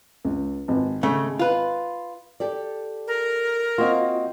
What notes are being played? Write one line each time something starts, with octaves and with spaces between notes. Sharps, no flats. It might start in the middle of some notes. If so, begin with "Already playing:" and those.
C#2
G#1
C#3 A3
F4 B4
G4 A4 D5
A#4
A#3 C4 F4 F#4 D#5